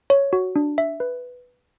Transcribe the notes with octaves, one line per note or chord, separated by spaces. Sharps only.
C#5
F#4
D4
E5
B4